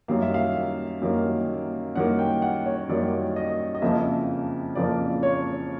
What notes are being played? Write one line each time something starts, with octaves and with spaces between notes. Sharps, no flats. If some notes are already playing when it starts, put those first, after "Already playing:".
F#2 D#3 G3 A#3 F5
E5
F5
F#2 D#3 G3 A#3
F#2 D#3 G3 A#3 F#5
G5
F#5
C#5
F#2 D#3 G3 A#3 D5
D#5
D#5
F2 C#3 F3 A#3 E5
F2 C#3 F3 A#3 D5
C#5